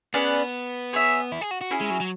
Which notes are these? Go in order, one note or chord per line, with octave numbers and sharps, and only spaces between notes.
B3 C#4 G#4 B4 D5
G#4 C#5 E5
E4
G#4
F#4
F#4
C#4 E4 G#4
G#3
F#3
F#3